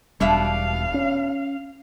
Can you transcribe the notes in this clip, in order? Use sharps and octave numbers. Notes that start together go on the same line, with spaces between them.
E1 B2 G3 D4 E5 F5
C#4